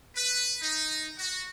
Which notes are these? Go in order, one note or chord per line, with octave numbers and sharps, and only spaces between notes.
B4
D#4
F#4